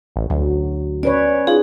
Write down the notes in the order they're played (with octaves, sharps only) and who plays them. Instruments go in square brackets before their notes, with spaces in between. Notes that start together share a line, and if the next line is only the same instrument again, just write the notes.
[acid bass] A1
[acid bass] D2 [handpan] F#3
[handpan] C#4 B4 C#5 [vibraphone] D5
[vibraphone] D#4 G#4 [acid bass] F4